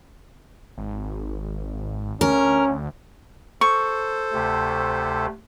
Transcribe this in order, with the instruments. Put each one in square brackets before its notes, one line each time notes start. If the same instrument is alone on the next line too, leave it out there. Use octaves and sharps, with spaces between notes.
[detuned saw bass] G#1
[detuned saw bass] D2 [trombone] C#4 [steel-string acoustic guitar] A#4
[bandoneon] A4 C5 [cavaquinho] C#6
[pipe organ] D2 C3 A3